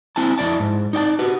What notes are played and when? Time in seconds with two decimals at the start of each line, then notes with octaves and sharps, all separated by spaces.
0.16 C4 E4 G#5 A5
0.38 F2 C#3 E4 D5 A5
0.60 G#2
0.93 D#4 D5 G5 A5
1.19 F#4 G4 B4